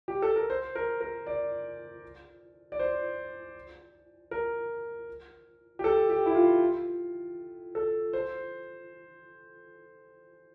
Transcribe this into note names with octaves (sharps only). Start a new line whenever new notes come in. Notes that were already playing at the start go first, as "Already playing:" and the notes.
G4
A4
A#4
C5
A#4
A#4
D5
D5
C5
A#4
G4
A4
G4
E4
F4
A4
C5